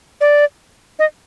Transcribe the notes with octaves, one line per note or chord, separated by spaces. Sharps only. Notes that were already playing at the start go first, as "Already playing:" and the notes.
D5
D#5